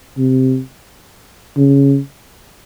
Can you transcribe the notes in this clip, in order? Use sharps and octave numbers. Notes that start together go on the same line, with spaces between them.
C3
C#3